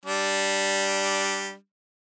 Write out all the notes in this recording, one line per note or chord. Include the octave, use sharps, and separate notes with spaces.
G3 D4